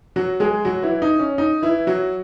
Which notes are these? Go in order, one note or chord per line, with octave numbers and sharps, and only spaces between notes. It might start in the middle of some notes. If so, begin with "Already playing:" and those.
F#3 F#4
G#3 G#4
F#3 F#4
E3 E4
D#4
C#4
D#4
E3 E4
F#3 F#4